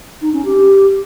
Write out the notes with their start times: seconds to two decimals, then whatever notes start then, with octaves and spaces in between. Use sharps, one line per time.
0.22 D#4
0.33 C#4
0.45 G4